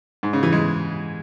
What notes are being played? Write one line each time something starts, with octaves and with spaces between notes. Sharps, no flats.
G#2
C#3
E3
G#3